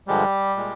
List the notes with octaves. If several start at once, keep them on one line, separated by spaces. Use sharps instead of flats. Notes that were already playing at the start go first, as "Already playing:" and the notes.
G2 D3 F3 G3 G#3 G4
A#2 G#3